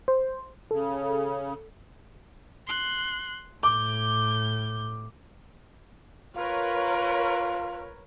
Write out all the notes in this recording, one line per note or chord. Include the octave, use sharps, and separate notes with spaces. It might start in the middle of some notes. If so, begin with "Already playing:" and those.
C5
C#3 A4
C6 F#6
A2 D6 G6
F4 A#4 B4 C#5